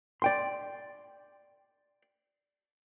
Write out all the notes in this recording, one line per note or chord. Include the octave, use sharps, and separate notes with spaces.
D5 G5 C6